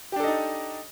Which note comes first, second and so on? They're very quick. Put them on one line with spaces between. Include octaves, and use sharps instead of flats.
G4 D4 A4 D#5 D#4